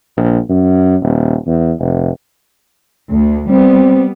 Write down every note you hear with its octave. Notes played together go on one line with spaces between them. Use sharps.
A#1
F#2
D#1
E2
F1
D2
G3 B3 C4